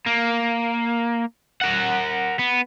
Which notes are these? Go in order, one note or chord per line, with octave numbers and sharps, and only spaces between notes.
A#3
A#4 F#5
B3